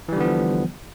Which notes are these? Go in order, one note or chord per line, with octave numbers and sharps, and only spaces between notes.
D3 E3 F3 G3 B3